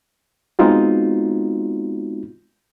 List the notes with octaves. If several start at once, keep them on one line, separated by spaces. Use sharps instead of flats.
G#3 B3 C4 D#4 F4 F#4